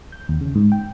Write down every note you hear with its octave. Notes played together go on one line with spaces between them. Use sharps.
G6
D#2
C#3
G#2
G5